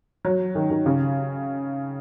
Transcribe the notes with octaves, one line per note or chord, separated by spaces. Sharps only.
F#3
D#3
D#3
C#3